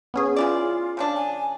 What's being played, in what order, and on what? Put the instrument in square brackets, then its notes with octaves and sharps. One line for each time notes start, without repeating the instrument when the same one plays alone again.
[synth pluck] B3 C#4 G#4
[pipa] C#3 E3 D5 [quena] F4
[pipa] C#3 F3 D4
[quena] G#5